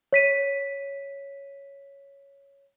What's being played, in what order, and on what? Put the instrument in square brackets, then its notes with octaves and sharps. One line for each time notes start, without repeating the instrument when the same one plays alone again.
[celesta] C#5 B6 D#7